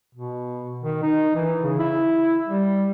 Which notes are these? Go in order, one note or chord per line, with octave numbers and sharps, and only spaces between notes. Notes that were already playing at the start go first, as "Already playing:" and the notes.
B2
D#3
D#4
E3
C#3
E4
G3